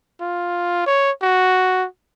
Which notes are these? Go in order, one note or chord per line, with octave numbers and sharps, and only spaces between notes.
F4
C#5
F#4